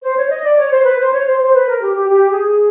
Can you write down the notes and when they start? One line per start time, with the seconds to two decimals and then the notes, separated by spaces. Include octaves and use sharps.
0.02 C5
0.17 C#5
0.30 D#5
0.44 D5
0.58 C#5
0.71 C5
0.85 B4
0.99 C5
1.13 C#5
1.27 C5
1.41 C5
1.54 B4
1.68 A#4
1.82 G4
1.96 G4
2.10 G4
2.30 G#4